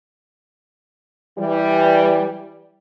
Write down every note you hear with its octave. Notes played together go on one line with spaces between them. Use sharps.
E3 G3